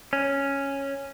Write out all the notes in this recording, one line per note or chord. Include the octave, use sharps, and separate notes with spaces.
C#4